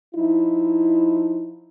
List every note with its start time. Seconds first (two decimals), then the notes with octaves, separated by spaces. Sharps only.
0.15 F3 D#4 E4